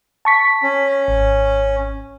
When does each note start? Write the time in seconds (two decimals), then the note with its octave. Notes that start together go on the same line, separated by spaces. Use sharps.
0.25 A5 C#6 B6
0.63 C#4
1.08 G#1